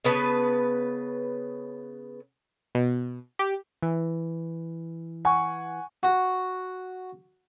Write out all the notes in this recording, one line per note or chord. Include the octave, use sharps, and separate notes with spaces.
C#3 B3 B4 A5
B2
G4
E3
F#5 G#5 C#6
F#4